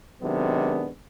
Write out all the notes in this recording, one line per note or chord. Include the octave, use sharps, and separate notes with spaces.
C3 D#3 F#3 G#3 B3 D4